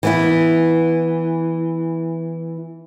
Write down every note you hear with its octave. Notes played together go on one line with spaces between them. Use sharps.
E3 B3 E4